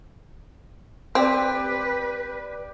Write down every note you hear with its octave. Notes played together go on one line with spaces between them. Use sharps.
C4 G4 B4 D5